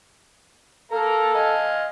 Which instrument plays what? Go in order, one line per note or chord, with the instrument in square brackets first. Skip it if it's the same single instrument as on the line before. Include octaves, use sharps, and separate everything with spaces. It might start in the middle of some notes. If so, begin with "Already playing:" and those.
[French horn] A4 [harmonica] A#4 F5 A#5
[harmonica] D#5 F5 G#5